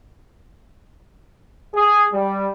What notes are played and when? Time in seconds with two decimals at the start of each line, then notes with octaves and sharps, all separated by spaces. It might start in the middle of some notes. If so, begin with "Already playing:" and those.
1.74 G#4
2.13 G3